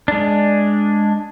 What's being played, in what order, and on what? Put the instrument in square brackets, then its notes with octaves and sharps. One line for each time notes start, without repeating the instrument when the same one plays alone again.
[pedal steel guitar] G#3 D4